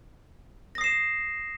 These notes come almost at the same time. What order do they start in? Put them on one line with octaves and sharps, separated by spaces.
A#6 D#6 C7 E7